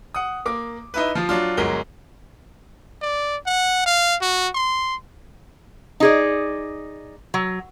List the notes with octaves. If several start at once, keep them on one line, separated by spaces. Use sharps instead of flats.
F#5 D#6
A#3 D6
D#4 E4 B4
F3 F4
F#3 D4 F4
G1 F#3 G#3 A#4 G7
D5
F#5
F5
F#4
C6
D#4 G#4 D5
F#3